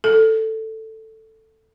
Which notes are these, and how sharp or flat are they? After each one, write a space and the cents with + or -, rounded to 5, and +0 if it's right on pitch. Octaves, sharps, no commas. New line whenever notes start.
A4 +10